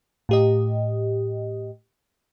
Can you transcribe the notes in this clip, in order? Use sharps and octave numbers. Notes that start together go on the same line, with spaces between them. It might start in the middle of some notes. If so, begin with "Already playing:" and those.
A2 G4 D#5